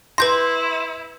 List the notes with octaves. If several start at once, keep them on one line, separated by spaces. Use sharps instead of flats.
E4 B4 C6 G6 A#6